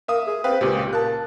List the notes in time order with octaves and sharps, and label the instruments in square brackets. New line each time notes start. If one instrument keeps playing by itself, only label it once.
[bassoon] A#3 [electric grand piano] E5 F5 D#6
[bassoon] G#4
[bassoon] C4 [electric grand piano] B4 F5 G5
[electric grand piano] C#2 A#2 [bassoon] G4
[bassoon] A#3 [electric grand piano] A5 F#6